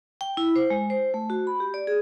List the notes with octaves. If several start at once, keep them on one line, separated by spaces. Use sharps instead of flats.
G5
E4
C5
G#3
C5
A3
F#4
B5
G4
D5
G#4